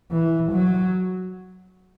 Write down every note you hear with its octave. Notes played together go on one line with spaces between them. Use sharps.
E3
F#3